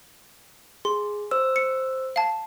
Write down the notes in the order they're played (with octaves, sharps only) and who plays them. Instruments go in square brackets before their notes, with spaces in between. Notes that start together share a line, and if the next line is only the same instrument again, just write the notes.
[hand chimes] G#4 [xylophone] C6
[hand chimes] C5 E6
[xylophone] C#7
F5 A5